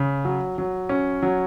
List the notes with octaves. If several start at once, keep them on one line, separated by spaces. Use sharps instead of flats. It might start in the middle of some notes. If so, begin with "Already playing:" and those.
Already playing: C#3
F#3
F#3
C#4
F#3